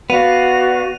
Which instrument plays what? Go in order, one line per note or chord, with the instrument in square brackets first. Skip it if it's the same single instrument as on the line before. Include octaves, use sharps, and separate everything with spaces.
[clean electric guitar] B3 [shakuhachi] F#4 [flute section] D5 F5 [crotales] D#7 F7